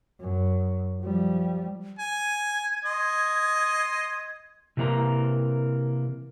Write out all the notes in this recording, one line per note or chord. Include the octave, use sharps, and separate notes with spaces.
F#2
F3 G3
G#5 G#6
D#5 C6
C3 E3 A#3 C#5 A#5